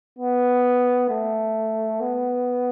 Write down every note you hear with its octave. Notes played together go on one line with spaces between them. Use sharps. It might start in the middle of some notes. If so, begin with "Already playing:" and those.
B3
A3
B3